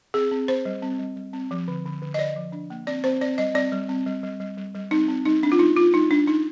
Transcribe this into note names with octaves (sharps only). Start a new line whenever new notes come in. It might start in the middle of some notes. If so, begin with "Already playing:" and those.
C4 G#4
C4
C4 C5
G3
C4
G3
G3
C4
F3
D3
D3
D3
D#5
D3 D5
F3
D4
A#3
C4 D5
C4 C5
C4 D5
G3 D#5
C4 D5
G3
C4
G3
G3
G3
G3
G3
C4 D#4
C4
G3 D#4
C4 D4
F4
G3 D#4
D4 F4
G3 D#4
D4
D4 D#4